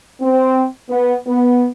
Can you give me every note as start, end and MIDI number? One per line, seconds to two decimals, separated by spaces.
0.21 0.65 60
0.90 1.16 59
1.27 1.68 59